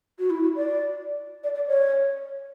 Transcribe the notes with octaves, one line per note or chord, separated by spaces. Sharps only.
F#4
E4
F#4
D5
D5
D5
C#5